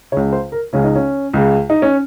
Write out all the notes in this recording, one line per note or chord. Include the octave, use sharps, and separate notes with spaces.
C#2 C#3 C#5
C5
A#4
C#2 C#3 C#4
D#4
C#4
C#2 C#3
D#4
C#4